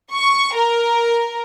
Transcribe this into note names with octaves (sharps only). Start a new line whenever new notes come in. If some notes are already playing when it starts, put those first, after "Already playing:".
C#6
A#4